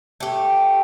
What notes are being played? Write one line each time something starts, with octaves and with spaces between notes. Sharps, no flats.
A3 G4